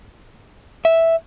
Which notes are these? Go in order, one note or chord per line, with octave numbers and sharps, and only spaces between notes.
E5